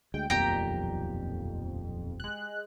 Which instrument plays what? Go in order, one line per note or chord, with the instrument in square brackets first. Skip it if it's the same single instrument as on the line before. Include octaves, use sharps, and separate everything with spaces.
[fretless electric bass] D2 G#3 [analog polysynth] G5
[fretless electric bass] D#1 B1 A#2 [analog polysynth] F2 [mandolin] G4 G5 A#5
[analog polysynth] G#3 F#6